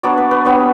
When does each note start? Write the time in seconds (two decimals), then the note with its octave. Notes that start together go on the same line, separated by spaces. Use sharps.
0.03 F#3 B3 D4 D5
0.17 B4
0.31 B4
0.45 G3 B3 D4 C#5